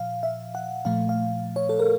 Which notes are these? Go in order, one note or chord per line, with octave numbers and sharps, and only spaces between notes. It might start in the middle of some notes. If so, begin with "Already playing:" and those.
Already playing: A#2 F3 F5
E5
F#5
A#2 F3 A3 F5
F5
C#5
A4
A#4